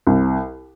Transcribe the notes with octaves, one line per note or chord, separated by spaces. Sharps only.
C2